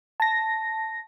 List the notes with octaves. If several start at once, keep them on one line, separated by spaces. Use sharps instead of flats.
A5 A#6